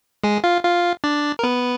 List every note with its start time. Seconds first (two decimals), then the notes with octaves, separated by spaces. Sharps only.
0.24 G#3 G#4
0.44 F4 F5
0.64 F4 F5
1.04 D4 D5
1.39 A#4
1.43 B3 B4